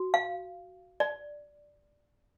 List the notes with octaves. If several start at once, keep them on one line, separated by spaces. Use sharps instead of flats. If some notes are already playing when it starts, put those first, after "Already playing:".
Already playing: F#4
F5
D5